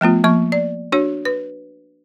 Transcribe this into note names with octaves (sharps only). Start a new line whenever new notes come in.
F3 A3 B3 F4
F3 A#3 C#6
D5
D4 F#4 C#5
B4